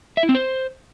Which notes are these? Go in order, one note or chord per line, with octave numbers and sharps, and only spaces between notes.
E5
E4
C4
C5